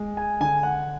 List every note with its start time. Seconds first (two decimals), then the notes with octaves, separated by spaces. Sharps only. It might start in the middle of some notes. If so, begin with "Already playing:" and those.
Already playing: G#3
0.17 G#5
0.40 D3 G#5
0.63 F#5